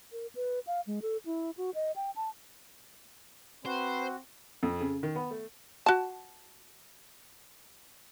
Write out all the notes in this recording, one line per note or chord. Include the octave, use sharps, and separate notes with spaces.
A#4
B4
F5
G#3
A4
E4
F#4
D#5
G5
A5
C4 F#4 B4 C5
F2
C#3
D#3
B3
A3
F#4 A5